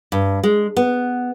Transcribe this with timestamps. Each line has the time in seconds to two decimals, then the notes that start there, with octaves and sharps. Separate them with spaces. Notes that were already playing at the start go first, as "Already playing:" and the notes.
0.12 G2
0.43 G#3
0.76 B3